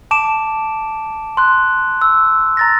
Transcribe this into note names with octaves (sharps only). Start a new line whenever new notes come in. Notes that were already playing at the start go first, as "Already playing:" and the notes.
A5 D6 D7 E7
C6 F#6
E6
A#5 A6 A#6